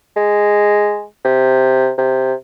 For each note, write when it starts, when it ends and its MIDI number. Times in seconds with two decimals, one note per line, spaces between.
0.16 1.04 56
1.25 1.91 48
1.98 2.34 48